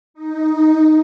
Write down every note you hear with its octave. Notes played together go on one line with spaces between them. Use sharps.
D#4